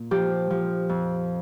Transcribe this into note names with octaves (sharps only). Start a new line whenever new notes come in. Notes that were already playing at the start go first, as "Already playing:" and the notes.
Already playing: A#2
F3 G4
F3
F2